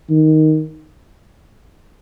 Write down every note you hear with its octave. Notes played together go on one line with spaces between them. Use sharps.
D#3